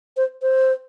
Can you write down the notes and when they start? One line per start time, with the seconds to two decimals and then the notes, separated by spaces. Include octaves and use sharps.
0.17 C5
0.42 C5